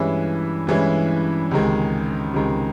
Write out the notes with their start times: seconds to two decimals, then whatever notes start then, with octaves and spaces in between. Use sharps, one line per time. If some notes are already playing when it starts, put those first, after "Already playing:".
Already playing: G2 E3 G#3 C#4 E4
0.67 G2 E3 G#3 C#4 E4
1.51 C#2 C3 D#3 G#3
2.34 C#2 C3 D#3 G#3